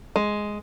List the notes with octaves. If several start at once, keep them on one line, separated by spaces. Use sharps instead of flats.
G#3